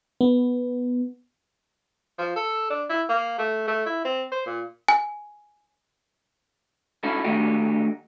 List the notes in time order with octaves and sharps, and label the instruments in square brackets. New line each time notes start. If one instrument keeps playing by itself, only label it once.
[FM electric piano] B3
[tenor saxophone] F3
A4
D4
E4
A#3
A3
A3
E4
C4
C5
A#2
[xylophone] G#5
[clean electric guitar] C#4 D#4 E4 F#4 A4
D3 D#3 A3 D#4 F#4 G4